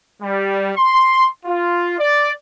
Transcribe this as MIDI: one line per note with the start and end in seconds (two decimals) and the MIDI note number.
0.22 0.70 55
0.77 1.28 84
1.46 1.99 65
1.99 2.31 74